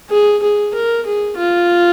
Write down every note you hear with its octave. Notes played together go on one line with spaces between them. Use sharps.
G#4
G#4
A#4
G#4
F4